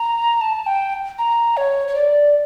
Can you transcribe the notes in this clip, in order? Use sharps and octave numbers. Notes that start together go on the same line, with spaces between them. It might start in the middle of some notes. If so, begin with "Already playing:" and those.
Already playing: A#5
A5
G5
A#5
C#5
C#5
D5